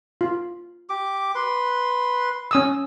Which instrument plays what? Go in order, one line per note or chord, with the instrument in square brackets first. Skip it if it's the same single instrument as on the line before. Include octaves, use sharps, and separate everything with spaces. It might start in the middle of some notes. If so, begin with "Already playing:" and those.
[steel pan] F4
[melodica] G4 D6
B4 C6
[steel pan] C#4 D#6 E6